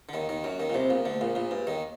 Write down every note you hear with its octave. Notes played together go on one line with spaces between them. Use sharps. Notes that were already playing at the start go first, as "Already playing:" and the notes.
D3
D#2 D#3
D#2 D#3
F#2 F#3
D#2 D#3
A#2
C2 C3
A#1 A#2
D2 D3
A#1 A#2
A#1 A#2
G2
D#2 D#3